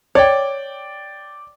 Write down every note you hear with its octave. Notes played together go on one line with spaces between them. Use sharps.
C#5 D5 G5